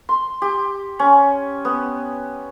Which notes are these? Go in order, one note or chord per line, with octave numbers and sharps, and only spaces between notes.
C6
G4
C#4
B3